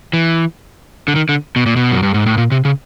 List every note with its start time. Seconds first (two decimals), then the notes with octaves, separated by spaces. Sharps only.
0.13 E3
1.08 D3
1.15 D#3
1.29 D3
1.56 B2
1.66 A#2
1.76 B2
1.92 F#2
2.03 G2
2.14 G#2
2.26 A2
2.38 A#2
2.51 C3
2.65 C#3